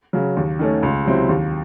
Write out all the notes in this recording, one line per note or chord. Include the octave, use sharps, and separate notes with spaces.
C#3 F#3
D#2
D#3 A3 C#4
C#2
C3 F#3 C4 E4
D#2